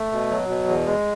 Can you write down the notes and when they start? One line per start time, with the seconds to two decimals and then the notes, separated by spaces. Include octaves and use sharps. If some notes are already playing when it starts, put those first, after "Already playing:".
Already playing: A3
0.12 B2
0.31 F#3
0.49 B2
0.67 E2
0.86 G#3